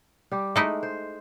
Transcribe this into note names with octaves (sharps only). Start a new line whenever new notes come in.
G3 G4
G#3 A3 D#4 E4
C5